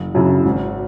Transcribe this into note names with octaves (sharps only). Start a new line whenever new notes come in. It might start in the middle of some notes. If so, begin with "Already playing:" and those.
Already playing: F#1
F#2 C#3 F#3 E4
G#1